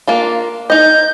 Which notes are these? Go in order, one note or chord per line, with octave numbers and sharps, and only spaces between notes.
A#3 D4 F4
D#4 D#5 G6